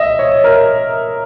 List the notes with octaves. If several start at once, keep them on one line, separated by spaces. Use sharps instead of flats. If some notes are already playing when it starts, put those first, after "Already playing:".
Already playing: D#5 E5
C#5
A#4